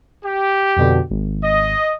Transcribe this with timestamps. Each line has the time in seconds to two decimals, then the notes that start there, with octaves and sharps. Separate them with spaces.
0.24 G4
0.76 F2 B2 D3
1.10 G#1
1.42 D#5